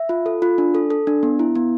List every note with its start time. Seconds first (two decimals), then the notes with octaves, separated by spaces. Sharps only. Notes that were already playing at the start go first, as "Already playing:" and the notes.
Already playing: E5
0.09 F4
0.26 A4
0.42 F4
0.58 D4
0.75 A4
0.90 A4
1.07 D4
1.23 B3
1.39 E4
1.56 B3